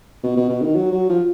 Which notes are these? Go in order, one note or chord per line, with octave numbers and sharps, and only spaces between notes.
B2
B2
B2
D#3
F#3
F#3
F3